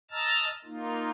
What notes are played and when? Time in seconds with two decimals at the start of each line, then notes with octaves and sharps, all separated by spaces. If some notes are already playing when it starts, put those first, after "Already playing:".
0.11 D#5 A5 A#5 E6 F6 A6
0.65 A#3 D#4 F4